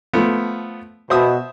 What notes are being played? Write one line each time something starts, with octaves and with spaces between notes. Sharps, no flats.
F3 A3 B3
B2 C5 E5 D#6